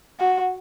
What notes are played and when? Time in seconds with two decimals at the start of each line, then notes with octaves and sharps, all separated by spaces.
0.19 F#4